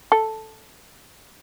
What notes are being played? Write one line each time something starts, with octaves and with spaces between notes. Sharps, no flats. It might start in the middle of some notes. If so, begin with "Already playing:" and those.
A4